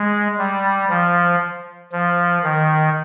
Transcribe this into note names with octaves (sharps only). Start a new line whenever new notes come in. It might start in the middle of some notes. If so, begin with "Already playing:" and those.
Already playing: G#3
G3
F3
F3
D#3